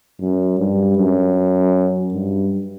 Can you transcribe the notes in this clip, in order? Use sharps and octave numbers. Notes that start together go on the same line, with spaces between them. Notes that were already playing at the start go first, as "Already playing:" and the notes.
F#2
G2
F#2
G2